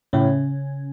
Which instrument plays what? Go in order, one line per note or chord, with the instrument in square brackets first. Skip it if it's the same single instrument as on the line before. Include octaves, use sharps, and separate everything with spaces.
[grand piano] A2 [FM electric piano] C#3 C#4